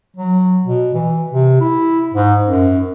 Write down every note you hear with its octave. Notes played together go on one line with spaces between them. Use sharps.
F#3
B2
E3
C3
E4
G#2
F#2